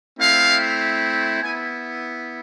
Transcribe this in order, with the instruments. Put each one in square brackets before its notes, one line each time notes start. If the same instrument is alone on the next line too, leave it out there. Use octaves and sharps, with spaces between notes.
[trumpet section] A3 C4 E4 F5
B3 E4 G#5